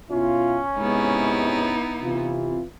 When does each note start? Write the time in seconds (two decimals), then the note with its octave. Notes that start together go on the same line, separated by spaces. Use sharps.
0.10 B2 C#4 E4 F4
0.78 G#2 C3 G#3 B3 D#4 E4
2.02 C3 E3 F4